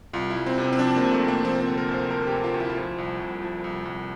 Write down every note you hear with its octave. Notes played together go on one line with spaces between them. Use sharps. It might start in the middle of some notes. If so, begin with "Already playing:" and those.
C2 F4
E4
C2
C4
C3 C4
C4
F3 D4
C3 A#3
A3
C3
A#3
F3 C4
A#3
C4
D3
A#4
D2
C5
D3 A#4
G4
D2
F4
D2
E4
F4
F3 E4
C2
C2
F3
C2
C2